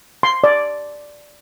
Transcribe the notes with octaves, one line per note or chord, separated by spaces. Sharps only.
C6
D5